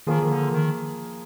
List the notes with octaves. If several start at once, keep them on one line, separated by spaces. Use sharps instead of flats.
D#3 F3 A#3 F4 G#4
D#3
D3
D#3